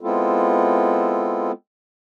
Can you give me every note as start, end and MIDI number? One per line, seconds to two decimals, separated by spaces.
0.01 1.52 56
0.01 1.52 59
0.01 1.52 60
0.01 1.52 64
0.01 1.52 65
0.01 1.52 69